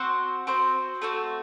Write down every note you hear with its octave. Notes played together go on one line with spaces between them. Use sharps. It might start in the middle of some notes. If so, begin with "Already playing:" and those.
Already playing: C4 F#4 C5 F#5
C4 F#4 C5
A3 C4 F#4